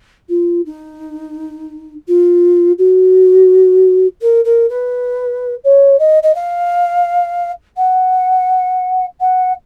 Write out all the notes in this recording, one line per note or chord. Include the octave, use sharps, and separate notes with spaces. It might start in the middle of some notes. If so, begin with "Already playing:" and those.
F4
D#4
F4
F#4
A#4
A#4
B4
C#5
D#5
D#5
F5
F#5
F#5